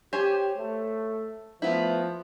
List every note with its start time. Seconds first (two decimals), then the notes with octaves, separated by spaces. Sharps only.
0.13 G4 C5 C#5 G#5
0.56 A3
1.62 F3 A3 B3 E4